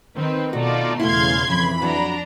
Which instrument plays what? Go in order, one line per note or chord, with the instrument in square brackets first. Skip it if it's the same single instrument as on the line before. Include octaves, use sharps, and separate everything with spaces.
[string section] D#3 C4 [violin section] B4
[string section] B2 [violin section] A3 D#4 [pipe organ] F4 D5 [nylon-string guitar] F#4
[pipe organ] E2 C#3 F5 [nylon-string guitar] A3 B3 E4 [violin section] C6 G#6
[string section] F2 B5 [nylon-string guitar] C#3 [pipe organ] E3
[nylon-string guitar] F#3 [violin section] D4 A#5